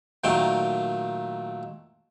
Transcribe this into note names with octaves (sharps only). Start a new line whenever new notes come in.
A#2 D#3 F#3 A3 G5